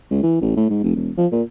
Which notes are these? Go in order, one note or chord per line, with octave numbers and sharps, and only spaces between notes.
C#2
E3
A1
A2
G#2
F1
E1
F3
A#2